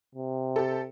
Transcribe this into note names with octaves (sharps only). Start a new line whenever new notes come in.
C3
G4 A4